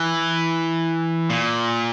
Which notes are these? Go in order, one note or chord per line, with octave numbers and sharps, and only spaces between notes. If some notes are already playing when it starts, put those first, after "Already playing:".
Already playing: E3
A#2